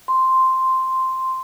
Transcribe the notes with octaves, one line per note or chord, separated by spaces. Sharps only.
C6